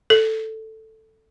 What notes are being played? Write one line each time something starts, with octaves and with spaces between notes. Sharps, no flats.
A4